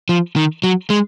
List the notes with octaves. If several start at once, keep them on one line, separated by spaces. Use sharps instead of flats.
F3
D#3
F#3
G#3